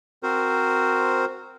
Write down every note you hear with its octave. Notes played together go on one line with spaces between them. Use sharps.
C4 F#4 A#4 C5